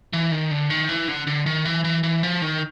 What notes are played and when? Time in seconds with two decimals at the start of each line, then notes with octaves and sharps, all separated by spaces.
0.13 E3
0.32 D#3
0.51 D3
0.70 D#3
0.89 E3
1.08 D3
1.27 D3
1.46 D#3
1.65 E3
1.84 E3
2.03 E3
2.23 F3
2.42 D#3